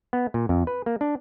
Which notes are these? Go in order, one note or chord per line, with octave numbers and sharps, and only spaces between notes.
B3
A#2
F2
B4
A#3
D4